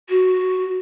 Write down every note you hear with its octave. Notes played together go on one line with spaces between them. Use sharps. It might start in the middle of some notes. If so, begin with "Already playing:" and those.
F#4